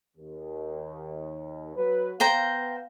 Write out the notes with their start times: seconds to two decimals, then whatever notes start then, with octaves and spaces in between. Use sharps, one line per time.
0.17 D#2
1.76 F#3 B4
2.20 B3 C5 F5 G5 A#5